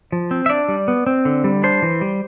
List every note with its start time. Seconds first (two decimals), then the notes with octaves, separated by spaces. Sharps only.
0.12 F3
0.31 C4
0.46 E5
0.50 D4 D5
0.69 G3
0.88 B3
1.07 C4
1.25 D3
1.44 G3
1.63 D4 C5
1.82 E3
2.01 G3